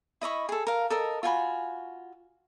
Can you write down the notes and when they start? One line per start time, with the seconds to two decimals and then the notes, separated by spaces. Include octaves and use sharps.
0.21 E4 D#5 B5 C#6
0.49 G#4 A4
0.67 A#4 F5
0.90 A4 A#4 D#5
1.23 F4 F#4 G#5 B5